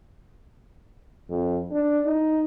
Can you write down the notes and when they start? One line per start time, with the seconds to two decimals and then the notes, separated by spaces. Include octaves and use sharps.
1.30 F2
1.72 D4
2.05 D#4